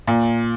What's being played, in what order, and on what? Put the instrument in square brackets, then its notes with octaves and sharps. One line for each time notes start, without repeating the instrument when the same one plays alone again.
[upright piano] A#2